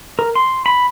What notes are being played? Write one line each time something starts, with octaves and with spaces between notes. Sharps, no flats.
A#4
C6
B5